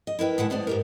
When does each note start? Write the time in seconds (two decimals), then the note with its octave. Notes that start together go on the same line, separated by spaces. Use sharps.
0.07 D#5
0.19 E4 A#4 B4 G5
0.38 A2 G#3 E4 F#5 A5
0.50 G#3 B3 C5 D5
0.67 G#2 G4 A#4